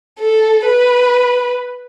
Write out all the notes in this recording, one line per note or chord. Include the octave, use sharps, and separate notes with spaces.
A4
B4